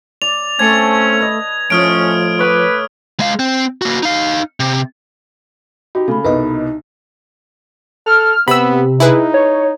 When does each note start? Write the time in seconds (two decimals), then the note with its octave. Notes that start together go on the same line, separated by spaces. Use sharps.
0.22 D5 F7
0.59 A3 C4 C#4 A5 G#6
1.20 B4 D#5 B5
1.70 A2 F3 C#4 D#6 F6 D7
2.39 B4 C#5 B5 D6
3.20 G#3 F5
3.39 C4
3.82 A#3 F#4
4.03 D#4 F5
4.60 C3
5.95 D#4 F#4 G4
6.08 C#3 A3 A4 B5
6.24 C2 B2 D#4 A#4 B4 D#5
8.06 A4 F6
8.48 C3 B3 B5 E6
9.00 D#4 E4 G#4 B4
9.34 C#5